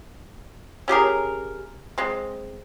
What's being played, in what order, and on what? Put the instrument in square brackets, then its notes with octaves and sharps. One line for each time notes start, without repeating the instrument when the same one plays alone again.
[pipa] C#4 G4 G#4 A#4
G#3 C4